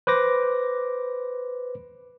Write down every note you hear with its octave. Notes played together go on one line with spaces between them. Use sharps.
B4 C5 D6 A#6